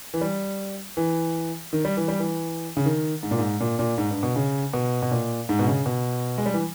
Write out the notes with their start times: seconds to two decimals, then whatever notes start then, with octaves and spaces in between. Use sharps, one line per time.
0.14 E3
0.21 G3
0.97 E3
1.73 D#3
1.85 G3
1.97 E3
2.08 G3
2.19 E3
2.77 C#3
2.85 D#3
3.23 G#2
3.31 A#2
3.38 G#2
3.60 A#2
3.79 A#2
3.98 G#2
4.11 G2
4.23 B2
4.36 C#3
4.73 B2
5.02 B2
5.11 A#2
5.49 G#2
5.59 B2
5.67 C#3
5.86 B2
6.38 G#3
6.46 G3
6.54 E3